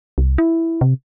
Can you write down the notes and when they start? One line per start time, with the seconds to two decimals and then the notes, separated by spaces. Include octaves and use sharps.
0.18 C2
0.38 E4
0.81 C3